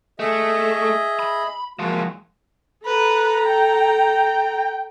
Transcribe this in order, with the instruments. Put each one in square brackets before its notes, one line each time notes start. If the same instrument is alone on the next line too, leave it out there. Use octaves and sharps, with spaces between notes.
[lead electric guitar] A3 [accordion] G#4 D#5 E5
[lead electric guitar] B5
[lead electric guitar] F3 G#3 [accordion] A#3 F#4
[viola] A4 A#5 [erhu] B4
[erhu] G5